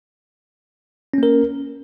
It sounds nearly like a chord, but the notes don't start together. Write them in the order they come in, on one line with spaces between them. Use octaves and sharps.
C#4 A#3 A#4